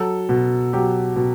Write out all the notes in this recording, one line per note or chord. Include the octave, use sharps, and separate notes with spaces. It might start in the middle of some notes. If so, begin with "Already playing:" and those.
Already playing: F#3 A4
B2
F#3 G4
B2